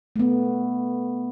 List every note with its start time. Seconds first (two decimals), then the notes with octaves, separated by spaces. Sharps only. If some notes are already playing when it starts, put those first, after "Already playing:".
0.16 A3 B3